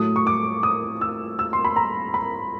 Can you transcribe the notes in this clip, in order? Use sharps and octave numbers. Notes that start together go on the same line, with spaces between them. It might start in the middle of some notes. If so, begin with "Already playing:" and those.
Already playing: A2 F#3 A3 D#6
C#6
D6
D#6
E6
E6
C6
B5
A#5
B5